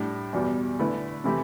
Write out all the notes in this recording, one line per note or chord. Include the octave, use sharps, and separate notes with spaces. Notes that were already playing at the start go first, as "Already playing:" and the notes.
Already playing: A2 G3 D4
E2 B2 G3
D3 A3 E4 B4
C3 E3 A3 E4 G4